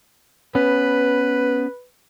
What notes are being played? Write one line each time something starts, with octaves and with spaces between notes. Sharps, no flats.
B3 C#4 B4